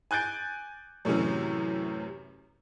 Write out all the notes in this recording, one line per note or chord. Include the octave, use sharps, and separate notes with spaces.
G#5 F#6 G6 A6 D7
F#2 A2 C3 E3 C#4